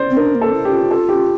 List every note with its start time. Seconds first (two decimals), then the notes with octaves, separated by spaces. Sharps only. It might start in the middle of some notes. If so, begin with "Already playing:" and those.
Already playing: C5 D5
0.10 C4
0.17 D4 A#4
0.35 A#3
0.41 A4
0.53 E4
0.65 G4
0.72 F4
0.91 A4
1.09 G4